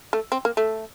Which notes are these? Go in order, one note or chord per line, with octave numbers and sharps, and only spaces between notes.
A3
C4
A#3
A3